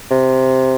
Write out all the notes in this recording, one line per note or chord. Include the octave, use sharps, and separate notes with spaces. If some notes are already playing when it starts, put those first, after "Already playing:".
C3